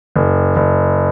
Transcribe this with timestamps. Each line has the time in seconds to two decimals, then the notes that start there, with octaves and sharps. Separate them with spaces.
0.16 F#1
0.56 F#1